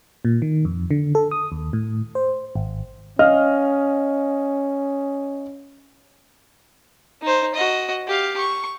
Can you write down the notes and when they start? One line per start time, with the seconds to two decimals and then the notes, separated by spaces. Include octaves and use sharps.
0.25 A#2
0.42 D#3
0.65 F2
0.91 D3
1.15 A4
1.31 D#6
1.52 D#2
1.73 A2
2.15 C5
2.55 G#1
3.19 C#4 D#5 F5 F6
7.22 D#4 C5
7.54 F#4 D#5
8.08 G4 F5
8.38 C#6